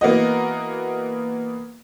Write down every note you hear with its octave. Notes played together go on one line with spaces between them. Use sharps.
E3 A#3 B3 F#4 D#5